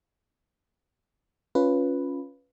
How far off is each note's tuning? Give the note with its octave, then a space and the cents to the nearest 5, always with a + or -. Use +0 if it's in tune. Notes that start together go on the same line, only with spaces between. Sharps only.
C#4 +0 F4 +0 B4 +0